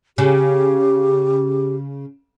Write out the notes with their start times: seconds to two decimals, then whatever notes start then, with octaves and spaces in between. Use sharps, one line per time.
0.18 C#3 G4